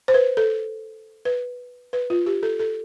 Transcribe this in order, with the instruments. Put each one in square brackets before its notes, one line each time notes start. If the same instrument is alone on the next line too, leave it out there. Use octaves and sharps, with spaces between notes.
[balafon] C5
B4
A4
B4
B4
F4
G4
A4
A4